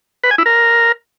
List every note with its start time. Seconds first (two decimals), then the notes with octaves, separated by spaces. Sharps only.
0.24 B4
0.31 G#5
0.38 E4
0.46 A#4